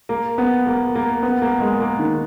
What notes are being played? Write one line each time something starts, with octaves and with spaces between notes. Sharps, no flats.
A#3
B3
A#3
A#3
B3
A#3
G#3
A#3
D#3